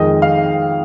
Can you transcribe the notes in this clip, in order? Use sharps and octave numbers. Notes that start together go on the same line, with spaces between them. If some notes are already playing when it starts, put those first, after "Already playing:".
Already playing: F2 D#3 G#3 D#5
F5